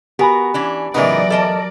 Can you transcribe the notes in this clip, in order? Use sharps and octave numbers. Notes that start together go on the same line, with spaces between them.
B3 F#4 G4 A#4 G#5 B5
E3 C#4 D4
A2 C#3 E3 F#3 B3 D#4 A#4 D5
A4 D#5 A5